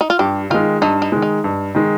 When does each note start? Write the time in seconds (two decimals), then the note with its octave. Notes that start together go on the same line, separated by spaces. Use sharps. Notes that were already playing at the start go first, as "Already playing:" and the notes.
0.01 D#4
0.10 F4
0.19 G2 G4
0.50 D#3 G#3 F4
0.81 G2 D#4
1.02 D#4
1.12 D#3 G#3
1.22 D#4
1.44 G2
1.75 D#3 G#3